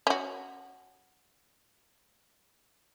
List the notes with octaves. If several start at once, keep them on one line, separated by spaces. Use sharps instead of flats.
C#4 F#4